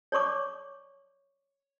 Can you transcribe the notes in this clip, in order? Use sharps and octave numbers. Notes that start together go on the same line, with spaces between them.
C#5 D5 C#6 D6